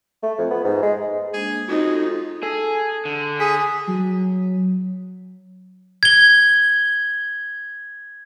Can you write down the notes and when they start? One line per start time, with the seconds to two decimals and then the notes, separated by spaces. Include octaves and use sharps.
0.23 A3
0.38 F2
0.50 B3
0.64 G#2
0.82 G#3
1.34 G#3 A#3 D4 G#4
1.69 F2 D#4 F4 F#4 A4 C5
2.43 G#4 A4
3.05 D3
3.40 G#4 B6
3.87 F#3
6.03 G#6 G7